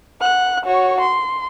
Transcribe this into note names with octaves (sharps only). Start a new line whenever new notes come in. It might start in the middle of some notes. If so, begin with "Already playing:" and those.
F#5 F#6
F#4 C#5
C6